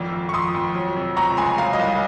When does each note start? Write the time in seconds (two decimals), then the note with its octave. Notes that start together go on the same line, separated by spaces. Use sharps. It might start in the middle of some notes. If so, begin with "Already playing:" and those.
Already playing: G#1 F2
0.13 F2
0.29 C#6
0.33 F2 C6 D#6
0.54 F2
0.75 F#3
0.96 C3
1.17 C#2 A#5 C#6
1.37 C#2 G#5 C6
1.58 F#3 F5 G#5
1.73 D#5
1.79 C2 F5